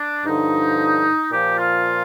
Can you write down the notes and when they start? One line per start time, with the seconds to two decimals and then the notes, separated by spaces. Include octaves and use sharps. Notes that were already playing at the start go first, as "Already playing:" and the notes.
Already playing: D4
0.25 G2 D3 F3 D#4
1.32 A#2 F3 G4
1.57 F4